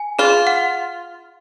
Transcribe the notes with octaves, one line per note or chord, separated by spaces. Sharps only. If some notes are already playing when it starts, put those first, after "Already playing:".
Already playing: G#5
F4 G#4
F#5